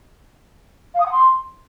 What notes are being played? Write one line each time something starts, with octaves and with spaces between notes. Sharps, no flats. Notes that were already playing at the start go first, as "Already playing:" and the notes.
F5
D#6
F#5
C6